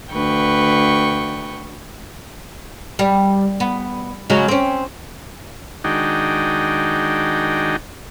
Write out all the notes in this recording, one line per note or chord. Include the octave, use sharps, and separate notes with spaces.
D2 B4 G5 C#6
G3
B3
C#3 F#3 G#3
C4 C#4
D#3 G#3 D4 D#4 F#4 G5